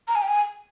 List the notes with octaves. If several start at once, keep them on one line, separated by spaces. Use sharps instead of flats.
A#5
G#5
G5
G#5